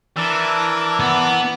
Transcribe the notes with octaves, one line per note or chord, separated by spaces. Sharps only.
E3 D4 A#4 D5 A5 E6
B3